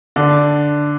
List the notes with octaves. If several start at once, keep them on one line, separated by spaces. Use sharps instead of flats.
D3 D4